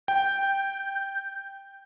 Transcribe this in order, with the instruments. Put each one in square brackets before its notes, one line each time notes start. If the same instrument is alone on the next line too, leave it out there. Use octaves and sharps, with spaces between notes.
[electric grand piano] G5 [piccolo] G6